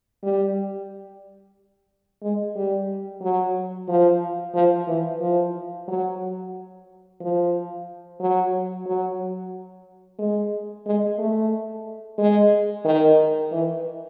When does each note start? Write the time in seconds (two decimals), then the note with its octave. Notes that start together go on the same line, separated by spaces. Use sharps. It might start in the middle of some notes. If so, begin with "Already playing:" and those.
0.23 G3
2.22 G#3
2.56 G3
3.21 F#3
3.88 F3
4.54 F3
4.87 E3
5.21 F3
5.88 F#3
7.21 F3
8.20 F#3
8.86 F#3
10.19 G#3
10.86 G#3
11.19 A3
12.18 G#3
12.85 D#3
13.52 E3